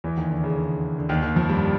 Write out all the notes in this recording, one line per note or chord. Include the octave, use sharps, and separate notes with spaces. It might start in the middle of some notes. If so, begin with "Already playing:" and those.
E2 E3
D#2 D#3
D3
C#3
D3
D3
D#2 D#3
D#2 D#3
F2 F3
G2 G3